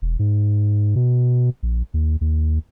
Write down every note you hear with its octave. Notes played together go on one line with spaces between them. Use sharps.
E1
G#2
B2
A#1
D#2
D#2